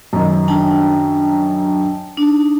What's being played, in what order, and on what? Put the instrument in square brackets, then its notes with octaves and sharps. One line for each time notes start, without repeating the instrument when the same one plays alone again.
[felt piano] F#2 D#3
[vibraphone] D4 G5 A5
D4 D#4